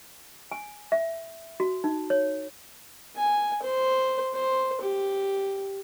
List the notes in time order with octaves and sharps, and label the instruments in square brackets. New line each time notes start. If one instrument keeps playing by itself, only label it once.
[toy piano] G#5
E5
F#4
D#4
C#5
[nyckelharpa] G#5
C5
C5
G4